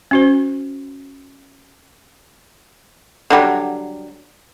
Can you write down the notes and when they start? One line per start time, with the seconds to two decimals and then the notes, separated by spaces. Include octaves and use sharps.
0.11 C#4 F#4 C5
3.30 D3 F#3 G3